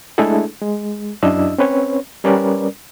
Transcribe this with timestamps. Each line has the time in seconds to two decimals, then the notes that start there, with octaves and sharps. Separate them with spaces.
0.18 G#3 A3 D4 E4 G#4 A4
0.62 G#3
1.23 F#2 D4 E4 D#5 E6
1.58 C4 C#4 B4 C#5
2.24 G3 C#4 A#4 B4 D5